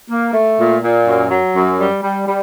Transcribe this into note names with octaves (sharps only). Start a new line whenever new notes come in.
A#3
A3
A#2
A#2
F#2
F#3
F#2
G3
G3
G3